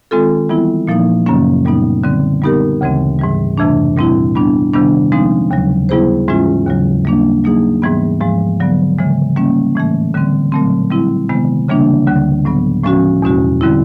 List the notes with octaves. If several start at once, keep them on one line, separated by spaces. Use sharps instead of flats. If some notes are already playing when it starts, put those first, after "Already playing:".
D#3 G#3 C4 F4 A4
E3 G3 B3 E4
A#2 F3 A#3 D#4
F#2 C#3 F#3 A#3 C#4
A#2 G3 B3 D#4
D3 G3 C4
G3 B3 D#4 G4 A#4
D2 C#3 E3 G#3 C4
G#2 E3 G3
F2 C3 E3 A3 D4
A#2 G3 C4 E4
G3 B3 D4
C3 D#3 G3 B3 D4
F3 G#3 C4 D#4
D#2 C#3 F#3
G3 B3 E4 G#4 C5
G#2 E3 G#3 C#4 F4
D#2 C#3 F#3
G3 A#3 D4
F#3 A#3 D#4 G#4
G#2 E3 G3 B3
G#2 F3 G#3
D3 F#3 B3
C#3 E3 G#3
G3 A#3 C#4
A2 E3 A3
D3 G3 C4
A#2 F#3 A3 C4
G3 C4 E4
C3 D#3 G#3 B3
C#3 E3 G3 A#3 D4
D2 D3 G3
A2 F#3 B3
A2 F3 G#3 C#4 F#4
E2 B2 G#3 C#4 F#4
D3 G3 C4 E4